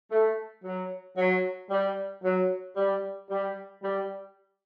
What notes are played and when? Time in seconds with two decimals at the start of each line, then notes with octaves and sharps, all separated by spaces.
0.11 A3
0.64 F#3
1.17 F#3
1.70 G3
2.23 F#3
2.76 G3
3.29 G3
3.83 G3